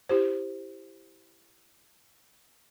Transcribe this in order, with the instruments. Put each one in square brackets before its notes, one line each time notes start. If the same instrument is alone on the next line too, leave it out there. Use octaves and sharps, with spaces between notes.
[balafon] E4 G4 C5